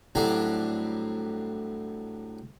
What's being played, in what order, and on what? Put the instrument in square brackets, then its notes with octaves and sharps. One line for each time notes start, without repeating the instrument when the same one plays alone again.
[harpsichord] A2 F#3 G3 C4 D4 G4